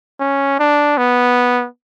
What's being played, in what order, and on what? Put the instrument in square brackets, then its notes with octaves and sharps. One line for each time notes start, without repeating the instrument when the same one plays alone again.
[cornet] C#4
D4
B3